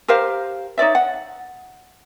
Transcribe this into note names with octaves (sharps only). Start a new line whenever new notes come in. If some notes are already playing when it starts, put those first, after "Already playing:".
G4 A#4 C5 F5
D#4 C#5 D5 E5
F#5